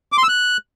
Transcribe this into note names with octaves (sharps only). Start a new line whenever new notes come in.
D6
C6
E6
F#6